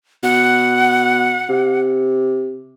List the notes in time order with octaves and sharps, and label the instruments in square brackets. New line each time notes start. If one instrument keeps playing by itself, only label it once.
[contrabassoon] B2 [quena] F#5
[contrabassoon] C3